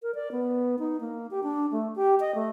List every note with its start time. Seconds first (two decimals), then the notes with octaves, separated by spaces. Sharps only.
0.03 A#4
0.15 D5
0.32 B3
0.79 D#4
1.00 A#3
1.31 G4
1.43 D4
1.72 A3
1.96 G4
2.20 D#5
2.35 A3